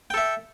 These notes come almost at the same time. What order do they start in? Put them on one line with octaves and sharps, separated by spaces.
G5 A4 E5